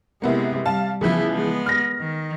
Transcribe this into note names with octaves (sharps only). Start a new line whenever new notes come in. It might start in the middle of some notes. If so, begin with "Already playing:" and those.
C3 G#3 A#3 B3 E4
G3 F5 A5
C#3 E3 F3 B3 E4
G#3 B3
F6 A#6
D#3